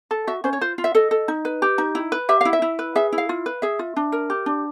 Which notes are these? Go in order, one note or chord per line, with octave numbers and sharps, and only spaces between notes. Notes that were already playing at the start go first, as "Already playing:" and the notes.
A4
F#4 E5
C#4 C5
C#5
F4 C5
F4
E5
A4 D#5
A4
D#4
B4
G4
D#4
E4
B4
G4 E5
E4 F5
E5
E4
B4
G#4 E5
E4
F5
F4
B4
G#4 E5
F4
D4
A#4
G4
D4